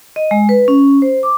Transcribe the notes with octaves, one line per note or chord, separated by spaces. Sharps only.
D#5
G#3
B4
C#4
C5
D6